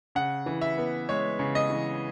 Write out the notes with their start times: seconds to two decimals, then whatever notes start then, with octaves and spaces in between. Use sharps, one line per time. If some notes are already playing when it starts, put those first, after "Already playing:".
0.15 C#3 F#5
0.46 E3
0.61 E5
0.78 B3
1.09 G#3 C#5
1.39 C#3
1.55 D#5
1.70 E3